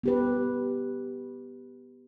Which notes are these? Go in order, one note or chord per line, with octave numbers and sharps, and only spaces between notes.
B3 G4 B4